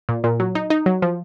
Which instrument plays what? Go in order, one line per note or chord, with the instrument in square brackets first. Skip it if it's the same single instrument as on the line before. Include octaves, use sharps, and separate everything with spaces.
[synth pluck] A#2
A#2
F#3
D#4
D#4
F#3
F3